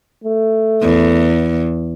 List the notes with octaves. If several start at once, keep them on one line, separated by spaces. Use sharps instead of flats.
A3
E2